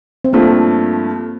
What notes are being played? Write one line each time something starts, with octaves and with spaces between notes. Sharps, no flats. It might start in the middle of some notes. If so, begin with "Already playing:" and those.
C4
G2 F3 A3 A#3